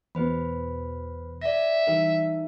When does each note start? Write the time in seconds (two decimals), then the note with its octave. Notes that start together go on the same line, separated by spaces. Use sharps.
0.15 E2 B2 B4 C5 B5
1.42 D5 E5 A#6
1.87 E3 G3 D#4 A#4